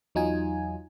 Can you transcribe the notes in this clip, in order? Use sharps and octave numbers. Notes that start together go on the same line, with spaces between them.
E2 F#3 D#4 F4 G#5